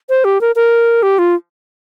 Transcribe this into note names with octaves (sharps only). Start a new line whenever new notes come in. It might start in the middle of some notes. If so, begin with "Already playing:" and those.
C5
G4
A#4
A#4
G4
F4